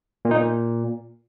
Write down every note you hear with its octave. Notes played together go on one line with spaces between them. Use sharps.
A#2
D#4
A#2